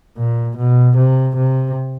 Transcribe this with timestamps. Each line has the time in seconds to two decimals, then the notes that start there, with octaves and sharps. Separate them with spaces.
0.18 A#2
0.57 B2
0.97 C3
1.37 C3